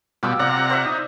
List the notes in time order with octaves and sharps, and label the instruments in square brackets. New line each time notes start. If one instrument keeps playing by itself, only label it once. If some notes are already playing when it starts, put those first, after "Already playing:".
[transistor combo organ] B2 G3 [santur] F4 D6 E6
[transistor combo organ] C3 F#5 A#5 [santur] D5
[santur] C5 E5
[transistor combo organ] D#4